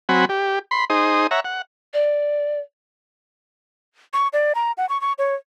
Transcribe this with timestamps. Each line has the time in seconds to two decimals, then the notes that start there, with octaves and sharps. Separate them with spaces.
0.09 F#3 C4 F#5 G#5 B5
0.29 G4
0.71 B5 C6
0.90 D#4 G#4 C5 D#6
1.31 C#5 E5 F#5 A#5
1.45 F#5
1.94 D5
4.13 C#6
4.33 D5
4.55 A#5
4.78 F#5
4.89 C#6
5.01 C#6
5.18 C#5